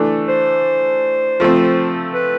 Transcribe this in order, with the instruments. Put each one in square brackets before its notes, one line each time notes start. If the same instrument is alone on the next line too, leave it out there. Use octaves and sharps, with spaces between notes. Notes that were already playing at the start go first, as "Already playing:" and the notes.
Already playing: [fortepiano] E3 A3 D4 A4
[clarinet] C5
[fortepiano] F3 A3 C4
[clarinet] B4